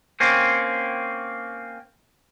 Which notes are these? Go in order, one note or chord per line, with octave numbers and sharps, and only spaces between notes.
A#3 C4 C#4